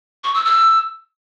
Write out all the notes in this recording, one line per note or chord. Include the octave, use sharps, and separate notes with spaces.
C#6
E6
E6